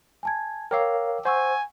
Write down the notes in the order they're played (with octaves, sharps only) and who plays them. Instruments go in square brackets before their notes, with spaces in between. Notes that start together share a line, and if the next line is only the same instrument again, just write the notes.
[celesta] G#5 A5 G#6
[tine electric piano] A#4 C#5 F5 [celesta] G5 D6 E6
[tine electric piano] C5 [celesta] F#5 C#6 E6 [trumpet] G#5